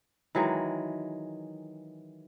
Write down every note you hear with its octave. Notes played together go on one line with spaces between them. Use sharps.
D#3 E3 F#3 G#3